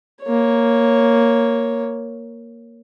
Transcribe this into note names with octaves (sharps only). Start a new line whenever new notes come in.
A#3 C#5